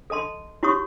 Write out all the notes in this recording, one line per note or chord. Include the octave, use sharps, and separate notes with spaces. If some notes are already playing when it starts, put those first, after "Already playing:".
A4 D#5 A5 C6
E4 F#4 G4 C#5 C#6 D#6